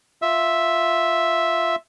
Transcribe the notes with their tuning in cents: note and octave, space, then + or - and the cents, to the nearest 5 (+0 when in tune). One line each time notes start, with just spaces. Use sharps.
F4 +0 E5 +0